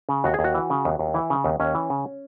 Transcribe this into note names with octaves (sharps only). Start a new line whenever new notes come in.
C#3
D#2 F#4
G#4
D#2
F#4
E3
C#3
D#2
D#2
E3 E4
C#3
D#2
D#2 C#4
E3
C#3